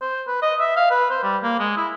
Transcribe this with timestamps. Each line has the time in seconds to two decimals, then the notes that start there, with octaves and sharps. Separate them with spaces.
0.02 C5
0.27 B4
0.42 D#5
0.60 E5
0.76 F5
0.91 B4
1.10 C5
1.23 G3
1.43 A#3
1.59 G#3
1.77 E4